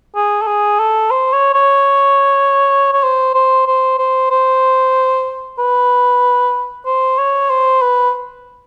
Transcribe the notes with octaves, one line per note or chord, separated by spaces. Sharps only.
G#4
A4
G#4
A4
C5
C#5
C#5
C#5
C5
C5
C5
C5
C5
B4
C5
C#5
C5
B4